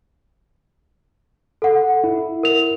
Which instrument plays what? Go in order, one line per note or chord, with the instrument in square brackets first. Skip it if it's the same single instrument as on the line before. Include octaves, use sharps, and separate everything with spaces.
[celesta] A4 F#5
[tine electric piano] E4
[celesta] A#4 F7